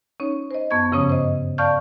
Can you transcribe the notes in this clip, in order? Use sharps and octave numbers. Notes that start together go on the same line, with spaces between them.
C#4 D#4 C#5
C5 D#5
F#2 B3 A5 C#6 G#6
G2 C#3 F3 C#4 C#5 D#6
C5 D#5
D5 F5 A5 C#6 F6 G6